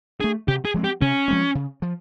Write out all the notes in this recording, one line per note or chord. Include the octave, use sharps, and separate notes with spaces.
A3 D4 G#4
C3 G4
G#4
F3 G#3 C4
G4
C3 C#4
F3 G#3 C4
C#3
F3